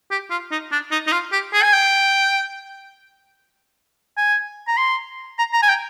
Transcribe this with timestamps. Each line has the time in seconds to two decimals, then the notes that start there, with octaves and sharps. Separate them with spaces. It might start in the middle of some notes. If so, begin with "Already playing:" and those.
0.11 G4
0.30 F4
0.51 D#4
0.72 D4
0.91 D#4
1.07 D#4
1.12 F4
1.32 G4
1.53 G#4
1.63 G#5
1.73 G5
4.17 G#5
4.67 A#5
4.77 C6
5.39 A#5
5.53 A#5
5.63 G#5
5.69 G5